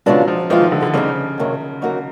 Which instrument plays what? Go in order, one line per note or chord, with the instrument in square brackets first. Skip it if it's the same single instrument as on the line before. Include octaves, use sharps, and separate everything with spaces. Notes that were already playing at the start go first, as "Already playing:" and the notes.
[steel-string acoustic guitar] C#3 F3 G#3 B3 D4 [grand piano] F#3
[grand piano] F3
[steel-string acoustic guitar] E3 G#3 C4 F4 [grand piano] F3
[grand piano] D#3
D3
D3
[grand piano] C#3 [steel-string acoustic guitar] G3 C4 D#4
[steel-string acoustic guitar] F2 C3 D#3 F#3
F#3 A#3 D#4 F#4 A#4